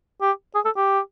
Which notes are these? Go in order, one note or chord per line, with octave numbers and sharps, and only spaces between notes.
G4
G#4
A4
G4